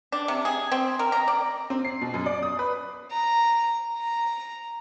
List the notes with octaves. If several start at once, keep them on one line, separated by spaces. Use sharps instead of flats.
D4
C3
G#4
C4
A#4
A#5
D5
C4
C7
B2
F#2
D5
D#6
B4
A#5
A#5